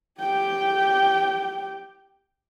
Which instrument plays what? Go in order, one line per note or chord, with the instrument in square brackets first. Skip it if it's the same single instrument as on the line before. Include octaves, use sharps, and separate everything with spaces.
[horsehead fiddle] G4 G5